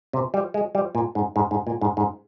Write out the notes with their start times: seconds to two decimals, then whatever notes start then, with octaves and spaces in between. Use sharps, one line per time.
0.13 C3
0.34 G3
0.54 G#3
0.75 G3
0.95 A#2
1.15 G#2
1.36 G#2
1.51 G#2
1.67 A#2
1.81 G#2
1.97 G#2